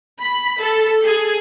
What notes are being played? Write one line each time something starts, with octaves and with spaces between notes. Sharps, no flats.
B5
A4
G#4